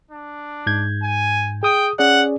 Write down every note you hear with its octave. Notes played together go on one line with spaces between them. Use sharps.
D4
G#2 G6 G#6
G#5
G#4 G5 D#6
C#4 G#4 D5 F#5